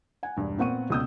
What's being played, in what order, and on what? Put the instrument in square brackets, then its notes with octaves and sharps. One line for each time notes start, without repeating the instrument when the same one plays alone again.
[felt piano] F#5 G#5
E1 G2
A#2 B3 C4 F#5 C#6 D#7
C#2 B2 D#6 E6 G6